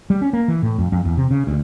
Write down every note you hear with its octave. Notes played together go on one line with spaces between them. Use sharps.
G3
C#4
A#3
E3
A2
F2
F2
E2
C3
C#3
D2